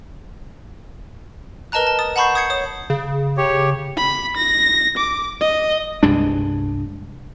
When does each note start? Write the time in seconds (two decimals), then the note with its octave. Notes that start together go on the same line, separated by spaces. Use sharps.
1.72 A#4 B4 D#5 A5 A#5 F#6
1.87 A5
1.99 D#6 A6
2.16 F#5 A5 B5 C#6 G6 C7
2.35 D#6 G6 G#6 C7 C#7
2.50 C#5 D#6
2.90 C#3
3.37 G4 C#5
3.97 B5
4.37 A#6
4.97 D6
5.41 D#5
6.03 C2 G2 G#3 D4